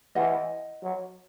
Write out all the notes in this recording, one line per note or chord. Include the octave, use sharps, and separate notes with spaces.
E3 D#5 F#5
F#3